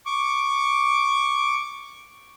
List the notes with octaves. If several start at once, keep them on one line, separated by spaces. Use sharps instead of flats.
C#6 D6